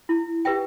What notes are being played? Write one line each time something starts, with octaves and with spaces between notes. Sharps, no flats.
E4
G4 B4 E5 G5